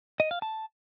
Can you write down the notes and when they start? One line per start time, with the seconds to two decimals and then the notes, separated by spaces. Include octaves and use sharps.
0.20 D#5
0.31 F5
0.42 A5